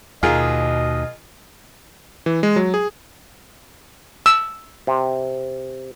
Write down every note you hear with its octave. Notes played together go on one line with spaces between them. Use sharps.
D#2 B2 F4 G#4 A#4 D#5
E3
G#3
F#3
G#4
E6
C3